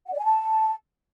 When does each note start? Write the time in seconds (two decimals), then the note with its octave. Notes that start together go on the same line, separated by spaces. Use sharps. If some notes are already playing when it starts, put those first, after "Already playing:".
0.06 F#5
0.12 D5
0.18 G#5
0.24 A5